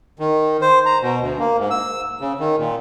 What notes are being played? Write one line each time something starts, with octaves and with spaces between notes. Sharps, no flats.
D#3
C5
A#5
B2
D2
A#3
G#2
E6
C#3
D#3
A#2